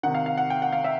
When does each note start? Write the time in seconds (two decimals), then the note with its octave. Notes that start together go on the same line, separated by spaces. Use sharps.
0.03 D#3 F#5
0.07 C3
0.15 F5
0.26 F5
0.37 F#5
0.50 G5
0.62 F#5
0.73 F5
0.84 E5